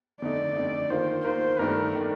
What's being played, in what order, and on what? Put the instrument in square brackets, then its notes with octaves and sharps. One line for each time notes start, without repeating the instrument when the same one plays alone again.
[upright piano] F2 D3 A3 D#4 [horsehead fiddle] D5
[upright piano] F2 D3 A3 D#4
[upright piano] D#3 A#3 F4 A#4 [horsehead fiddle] C5
[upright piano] D#3 A#3 F4 A#4 [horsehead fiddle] C5
[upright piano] G2 D#3 A3 D4 [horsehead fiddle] A#4
[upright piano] D#3 A3 D4